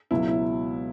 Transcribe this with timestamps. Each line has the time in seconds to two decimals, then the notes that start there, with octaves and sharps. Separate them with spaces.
0.11 C#2 B2 F#3 E4
0.28 E4